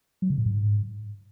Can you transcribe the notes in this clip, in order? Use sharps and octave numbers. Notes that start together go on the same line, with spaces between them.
F#3
C#3
A2
G#2